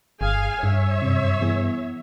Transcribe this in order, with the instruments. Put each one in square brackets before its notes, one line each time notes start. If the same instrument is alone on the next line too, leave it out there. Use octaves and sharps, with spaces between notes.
[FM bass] G1 [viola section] G#4 F5 G#5
[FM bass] G2 [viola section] C#5 E5
[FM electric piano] F#2 C3
E3 B3 G#4